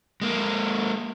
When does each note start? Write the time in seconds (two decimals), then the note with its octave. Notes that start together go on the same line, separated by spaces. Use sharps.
0.21 G#3 A#3